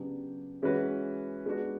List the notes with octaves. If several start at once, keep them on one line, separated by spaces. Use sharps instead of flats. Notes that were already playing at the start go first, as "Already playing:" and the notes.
Already playing: C#3 F#3 B3 D4 G4
E3 G#3 C#4 F#4 B4
G#3 B3 D4 F#4